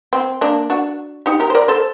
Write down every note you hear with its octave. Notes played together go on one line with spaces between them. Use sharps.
C4
A#3 D4
D4 F#4
D#4 G4
G4 A#4
C5
A#4 D5
A4 C5